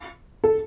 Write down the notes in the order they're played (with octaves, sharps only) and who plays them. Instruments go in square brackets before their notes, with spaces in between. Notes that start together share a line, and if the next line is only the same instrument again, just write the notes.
[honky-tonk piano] A4